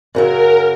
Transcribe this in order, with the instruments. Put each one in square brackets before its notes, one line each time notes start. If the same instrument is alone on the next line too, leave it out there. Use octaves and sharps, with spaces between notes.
[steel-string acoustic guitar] F#2 C#3 F#3 [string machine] A#4